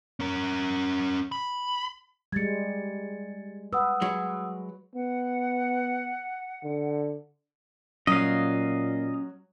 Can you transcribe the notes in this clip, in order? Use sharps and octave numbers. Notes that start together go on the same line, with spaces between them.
C#4 A#4
B5
G3 G#3 G#6 A6 C#7
B4 F#5 D#6 E6
F#3 G#3
B3 F#5
D3
A#2 F#3 C#4 D#5 F5